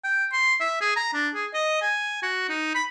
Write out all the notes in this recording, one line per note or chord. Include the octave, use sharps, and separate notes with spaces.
G5
C6
E5
G#4
A#5
D4
G#4
D#5
G#5
F#4
D#4
B5